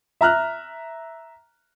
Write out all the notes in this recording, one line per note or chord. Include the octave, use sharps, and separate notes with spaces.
E5 A#5 F6 F#6